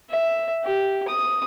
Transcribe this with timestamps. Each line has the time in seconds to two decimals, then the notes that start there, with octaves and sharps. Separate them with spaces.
0.10 E5
0.64 G4
1.08 D#6